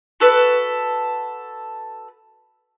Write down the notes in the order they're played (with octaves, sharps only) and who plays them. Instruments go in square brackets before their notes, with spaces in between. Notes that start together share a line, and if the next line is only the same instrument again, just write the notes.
[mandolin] F#4 A4 B4